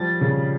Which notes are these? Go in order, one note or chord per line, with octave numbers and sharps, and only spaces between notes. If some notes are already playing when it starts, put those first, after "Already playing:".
Already playing: F3 G3 A6
C#3